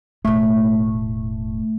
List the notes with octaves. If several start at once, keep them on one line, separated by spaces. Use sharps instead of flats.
E1 A2 A3